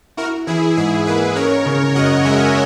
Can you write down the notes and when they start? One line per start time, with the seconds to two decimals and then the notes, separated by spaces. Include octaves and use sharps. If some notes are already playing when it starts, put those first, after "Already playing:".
0.17 E4 F#4 A#4
0.47 E3 E4 G#4
0.76 G#2 E4 G#4
1.07 A#3 G#4 B4
1.36 C#4 A#4 C#5
1.66 C#3
1.95 F#2 D#5 F#5
2.25 G#3 E5 G#5